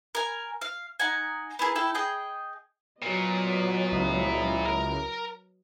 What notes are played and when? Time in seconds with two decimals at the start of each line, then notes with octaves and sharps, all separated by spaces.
0.15 A#4 G#5
0.62 F5
1.00 D#4 F#5 G#5
1.59 B3 E4 G#4 A#4
1.76 E4 A4 G5
1.95 G#4 D#5 G5
3.02 A#2 F#3 B3 D#5
3.92 C#2 E4
4.65 A#4 A#5